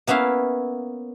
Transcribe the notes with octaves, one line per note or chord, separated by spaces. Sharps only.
A#3 B3 C#4 E4 F5